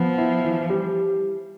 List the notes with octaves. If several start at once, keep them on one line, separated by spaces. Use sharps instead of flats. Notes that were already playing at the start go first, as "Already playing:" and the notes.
Already playing: F3 B3
E4
E3
G3